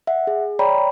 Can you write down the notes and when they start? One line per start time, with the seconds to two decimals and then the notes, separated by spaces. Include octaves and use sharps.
0.07 E5 F#5
0.27 G#4
0.59 C#5 D5 G5 A#5 B5